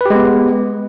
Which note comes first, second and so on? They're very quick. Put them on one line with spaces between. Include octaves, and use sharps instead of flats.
B4 G4 G#3 B3